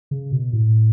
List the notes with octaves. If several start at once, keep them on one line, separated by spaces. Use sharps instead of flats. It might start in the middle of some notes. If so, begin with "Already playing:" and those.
C#3
B2
A2